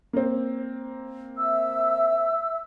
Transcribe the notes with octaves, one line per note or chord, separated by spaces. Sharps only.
A#3 C4
E5 E6